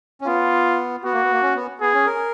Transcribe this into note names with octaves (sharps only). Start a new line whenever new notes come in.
C#4
B3 F4
B3 F#4
A#3
B3
A#3
C#4
B3
B3 G#4
C#4
A#4